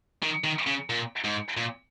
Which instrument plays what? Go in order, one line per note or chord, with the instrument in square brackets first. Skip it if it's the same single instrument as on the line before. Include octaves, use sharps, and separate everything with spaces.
[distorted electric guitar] D#3
D#3
C#3
A#2
G#2
A#2